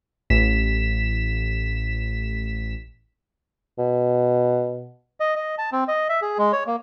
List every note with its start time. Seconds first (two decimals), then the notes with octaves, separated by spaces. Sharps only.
0.30 A1 B6 E7
3.79 B2
5.20 D#5
5.36 D#5
5.58 A5
5.72 C4
5.88 D#5
6.09 E5
6.22 G#4
6.38 G#3
6.53 C#5
6.67 A#3